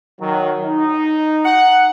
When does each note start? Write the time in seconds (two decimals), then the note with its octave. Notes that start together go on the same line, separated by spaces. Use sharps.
0.19 D#3 F#3
0.65 D#4
1.45 F#5